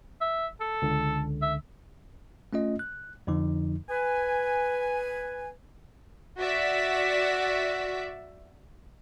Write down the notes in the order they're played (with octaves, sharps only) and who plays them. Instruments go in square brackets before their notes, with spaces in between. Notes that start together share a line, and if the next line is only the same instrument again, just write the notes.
[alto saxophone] E5
A4
[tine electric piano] C#2 D3
[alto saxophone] E5
[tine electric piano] A3 C#4 F4 D#5
F#6
F2 D3 F3 D#4
[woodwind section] B4 G#5
[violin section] F#4 D5 E5 B6